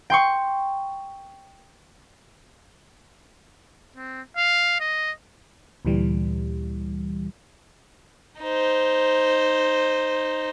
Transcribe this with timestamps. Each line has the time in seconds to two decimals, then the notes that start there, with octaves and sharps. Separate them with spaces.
0.10 G5 C6 C#6
3.96 C4
4.37 F5
4.80 D#5
5.85 D2 A#2 E3 G3
8.41 D#4 C5